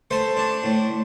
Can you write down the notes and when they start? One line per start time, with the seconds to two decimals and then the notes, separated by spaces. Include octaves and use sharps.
0.11 A3 C5
0.37 D4
0.64 A2